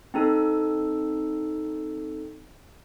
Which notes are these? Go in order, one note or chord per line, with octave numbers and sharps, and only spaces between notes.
C4 D#4 A4